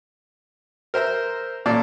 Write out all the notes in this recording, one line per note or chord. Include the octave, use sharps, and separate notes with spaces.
A#4 C5 E5 A#5
A1 A#2 D5 A5